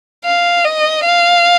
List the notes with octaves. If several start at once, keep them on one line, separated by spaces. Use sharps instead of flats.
F5
D#5
F5